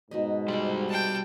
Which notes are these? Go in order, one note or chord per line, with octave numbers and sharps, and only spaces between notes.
G#2 B2 D#4 D#5
G3 G#3 E4 C5 F#5
G5 A5